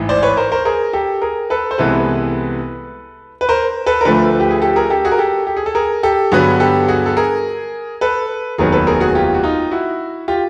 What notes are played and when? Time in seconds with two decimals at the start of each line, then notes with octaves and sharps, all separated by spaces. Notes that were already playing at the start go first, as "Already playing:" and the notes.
Already playing: A1 G#2 E3
0.09 C5 D5
0.23 B4 C#5
0.37 A#4 C5
0.52 A#4 C5
0.65 G#4 A#4
0.93 G4 A4
1.22 G#4 A#4
1.50 A4 B4
1.71 C5
1.78 C2 C3 E3 G#3 B3 A4 B4
3.41 B4
3.49 A#4 C5
3.86 A4 B4
4.01 A#4
4.05 D2 D3 F3 A3 A4 B4
4.40 G4
4.51 G#4
4.62 G4 A4
4.76 G#4 A#4
4.90 G4 A4
5.05 F#4 G#4
5.12 A#4
5.18 G4 A4
5.47 G4
5.57 G#4
5.66 A4
5.75 G#4 A#4
6.03 G4 A4
6.32 G2 D3 F#3 B3 F#4 G#4
6.60 G4 A4
6.88 F#4 G#4
7.06 A4
7.17 G#4 A#4
8.01 A4 B4
8.58 F1 D#2 D#3 F#3 B3 G#4 A#4
8.72 A4 B4
8.87 G#4 A#4
9.00 F#4 G#4
9.15 F4 G4
9.34 F#4
9.43 D#4 F4
9.71 E4 F#4
10.28 F4 G4